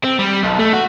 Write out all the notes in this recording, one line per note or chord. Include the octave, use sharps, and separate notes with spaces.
C4
G3
B1
A3
F#4